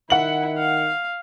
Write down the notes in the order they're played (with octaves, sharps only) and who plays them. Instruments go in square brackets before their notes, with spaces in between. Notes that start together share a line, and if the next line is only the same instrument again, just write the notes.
[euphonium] D#3 [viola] E4 [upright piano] F#5 F#7
[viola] F5